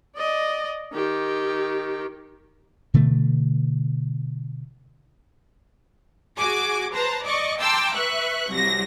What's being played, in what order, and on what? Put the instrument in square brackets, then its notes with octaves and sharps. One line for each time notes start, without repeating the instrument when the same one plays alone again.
[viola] D5 D#5
D#3 G4
[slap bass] B2 D3 E3 A3
[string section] F#4 G#4 G#5 D6
B4 C5 A5 A#5
D5 D#5 C#6 D6
G5 A5 A#5 C6 D6 E6
B4 E5 C#6 F#6
C2 F#3 A#6